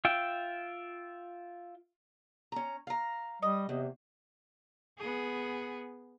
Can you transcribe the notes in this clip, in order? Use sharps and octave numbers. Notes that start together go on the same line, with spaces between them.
F4 E5 G5
C#4 A#5
F5 A#5
G3 D#5
E2 C3
B3 G#4